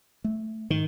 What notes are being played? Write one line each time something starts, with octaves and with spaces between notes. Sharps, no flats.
A3
G#2 D#3